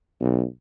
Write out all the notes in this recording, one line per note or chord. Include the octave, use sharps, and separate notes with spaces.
B1